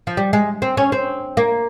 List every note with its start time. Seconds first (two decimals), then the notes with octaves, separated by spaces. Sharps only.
0.07 F3
0.17 G3
0.33 G#3
0.62 C4
0.77 C#4
0.92 C4
1.37 A#3